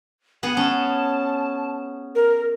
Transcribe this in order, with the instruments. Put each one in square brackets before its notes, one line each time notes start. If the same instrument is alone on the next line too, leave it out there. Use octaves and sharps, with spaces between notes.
[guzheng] B3 G#4 [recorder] F#5
[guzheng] C#4 [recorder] A5
[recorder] A#4